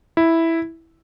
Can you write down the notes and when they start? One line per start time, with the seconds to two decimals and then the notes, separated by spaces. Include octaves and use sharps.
0.17 E4